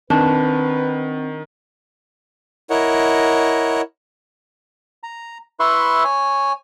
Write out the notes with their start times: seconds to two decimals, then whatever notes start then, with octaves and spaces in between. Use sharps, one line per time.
0.10 D#3 C4 D4 B4
2.70 E4 A#4 C#5 D#5 F#5
5.03 A#5
5.60 E4 B4 E5 C6 C#6
6.04 C#5 G#5